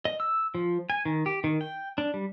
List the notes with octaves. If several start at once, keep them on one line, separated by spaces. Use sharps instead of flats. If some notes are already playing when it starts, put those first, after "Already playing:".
D#5
E6
F3
G#5
D#3
G4
D#3
G5
D4
G3